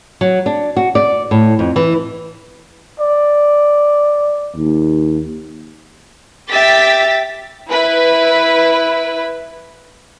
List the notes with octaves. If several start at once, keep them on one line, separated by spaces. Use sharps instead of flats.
F#3
D4
F#4
D5
A2
F2
E3
D5
D#2
G4 E5 G5 A6 B6
E4 B4